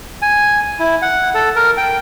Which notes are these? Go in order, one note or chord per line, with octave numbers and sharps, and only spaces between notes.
G#5
E4
F#5
A4
A#4
G5